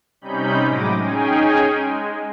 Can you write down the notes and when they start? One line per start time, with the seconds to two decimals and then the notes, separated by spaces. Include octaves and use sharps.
0.21 C3 G3 C#4 D#4 B5 G6
0.65 A2 F#3 G#3 D6 A#6 D#7
1.00 C#4 D#4 G#4 G5 G#5
1.73 G#3